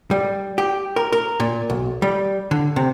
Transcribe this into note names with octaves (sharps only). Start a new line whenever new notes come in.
G3
G4
A#4
A#4
A#2
B1
G3
D3
C3